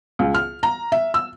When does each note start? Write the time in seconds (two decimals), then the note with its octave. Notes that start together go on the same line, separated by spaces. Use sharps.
0.19 C#2
0.34 F6
0.63 A#5
0.92 E5
1.14 E6